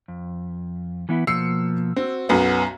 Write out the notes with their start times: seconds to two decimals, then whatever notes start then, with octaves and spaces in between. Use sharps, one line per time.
0.08 F2
1.09 E3 B3 E4
1.27 B2 F3 A#3 E6 C7 C#7
1.96 C4 F#4
2.29 B1 F#2 B3